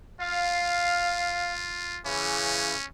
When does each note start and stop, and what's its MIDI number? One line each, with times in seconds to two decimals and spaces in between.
0.20 2.01 65
0.20 1.52 77
2.06 2.73 49
2.06 2.73 52
2.06 2.85 61